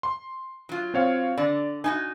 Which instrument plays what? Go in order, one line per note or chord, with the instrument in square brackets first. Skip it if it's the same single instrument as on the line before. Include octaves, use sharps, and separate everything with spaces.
[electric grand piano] C6
[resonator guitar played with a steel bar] F#3 F4
[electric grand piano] C4 C#5 F5
[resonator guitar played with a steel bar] D3 [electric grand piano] D5
[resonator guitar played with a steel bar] D#4 E4 F#4 [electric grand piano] G#5